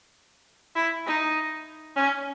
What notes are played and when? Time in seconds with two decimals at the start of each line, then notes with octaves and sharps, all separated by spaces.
0.76 E4
1.06 D#4
1.96 C#4